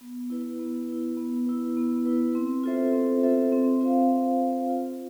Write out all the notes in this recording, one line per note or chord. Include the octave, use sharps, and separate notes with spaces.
B3
E4 B4
B3
E4 B4
B3
E4 B4
B3
E4 B4
C4
F4 A4 C5 E5
C4
F4 A4 C5 E5
C4
F4 C5 F5
C4
F4 C5 F5
F4